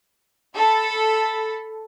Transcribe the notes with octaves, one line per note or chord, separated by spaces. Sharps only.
A4 B5